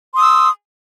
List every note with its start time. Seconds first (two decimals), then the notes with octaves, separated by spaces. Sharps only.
0.12 C6
0.16 D#6
0.19 E6